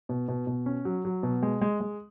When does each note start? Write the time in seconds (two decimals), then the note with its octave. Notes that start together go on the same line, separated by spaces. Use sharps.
0.09 B2
0.28 B2
0.47 B2
0.66 C#4
0.85 F#3
1.05 F#3
1.23 B2
1.42 G#3
1.61 G#3
1.80 G#3